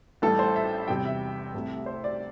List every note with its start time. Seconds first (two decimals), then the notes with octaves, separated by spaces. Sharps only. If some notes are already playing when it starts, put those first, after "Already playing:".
0.22 A1 A2 G3 A4
0.39 C5
0.56 E5
0.88 E2 C3 G3 G5
1.05 E5
1.54 C2 C3 A3
1.86 C5
2.04 D5